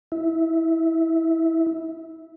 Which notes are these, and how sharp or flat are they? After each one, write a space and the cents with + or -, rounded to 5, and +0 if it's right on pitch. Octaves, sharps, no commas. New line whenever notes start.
E4 -15